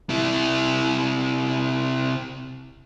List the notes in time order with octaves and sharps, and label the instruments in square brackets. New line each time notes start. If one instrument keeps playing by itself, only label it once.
[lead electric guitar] C3 E4